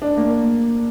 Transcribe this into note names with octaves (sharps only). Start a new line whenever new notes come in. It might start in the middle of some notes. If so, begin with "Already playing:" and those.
D4
A#3